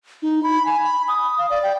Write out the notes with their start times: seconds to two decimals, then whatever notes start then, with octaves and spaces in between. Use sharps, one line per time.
0.22 D#4
0.43 B5
0.66 G#5
0.84 B5
1.08 D#6
1.38 F5
1.50 D5
1.63 G5